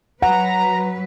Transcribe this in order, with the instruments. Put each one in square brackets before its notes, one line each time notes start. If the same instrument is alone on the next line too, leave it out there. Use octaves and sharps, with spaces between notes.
[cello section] F#3 B4 [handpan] F#5 [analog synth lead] A#5